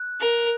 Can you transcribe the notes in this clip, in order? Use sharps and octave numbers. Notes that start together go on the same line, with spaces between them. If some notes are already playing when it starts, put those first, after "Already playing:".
Already playing: F#6
A#4